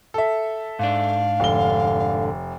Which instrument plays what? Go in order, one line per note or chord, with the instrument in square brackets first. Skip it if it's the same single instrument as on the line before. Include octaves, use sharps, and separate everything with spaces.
[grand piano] A4 E5
[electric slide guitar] G#2 D4 [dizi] F5
[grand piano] F1 G7 [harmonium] D3